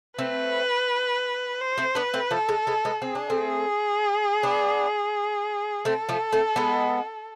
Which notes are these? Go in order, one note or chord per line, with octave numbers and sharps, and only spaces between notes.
A3 C4 B4
C5
A3 C4
B3 D4 B4
A3 C4
F3 A3 A4
G#3
G#3 B3
G#3 B3
C4 G#4
D4
A3 C4
B3 D4
A3 C4 A4
F3 A3
A3 C4
G#3 B3